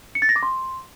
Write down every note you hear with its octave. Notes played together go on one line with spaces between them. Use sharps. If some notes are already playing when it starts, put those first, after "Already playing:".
C#7
A6
A#6
D6
C6